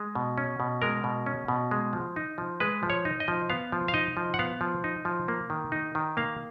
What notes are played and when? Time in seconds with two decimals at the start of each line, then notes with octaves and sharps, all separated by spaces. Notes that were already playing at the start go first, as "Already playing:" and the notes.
Already playing: G#3
0.15 B2
0.38 C#4
0.60 B2
0.82 G#3 A#4
1.04 B2
1.26 C#4
1.48 B2
1.71 G#3
1.93 F3
2.16 D#4
2.38 F3
2.60 G#3 B4
2.83 F3
2.90 C#5
3.05 D#4
3.20 D#5
3.28 F3
3.50 B3 F5
3.72 F3
3.88 F5
3.94 D#4 D#5
4.17 F3
4.34 F#5
4.39 B3 F5
4.61 F3
4.84 D#4
5.05 F3
5.28 A#3
5.50 D#3
5.72 D#4
5.95 D#3
6.17 A#3 F5